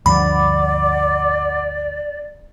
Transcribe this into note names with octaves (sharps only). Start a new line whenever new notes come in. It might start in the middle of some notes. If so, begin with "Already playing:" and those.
D2 G2 F3 D5 F#5 B5 D6